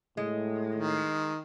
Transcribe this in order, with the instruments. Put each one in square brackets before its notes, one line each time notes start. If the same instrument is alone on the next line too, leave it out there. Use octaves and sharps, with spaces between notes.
[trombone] A2 [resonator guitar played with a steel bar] G#3
[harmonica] D#3